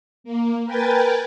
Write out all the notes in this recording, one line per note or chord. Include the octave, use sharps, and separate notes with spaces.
A#3
A#4 B4 G5 G#5 A6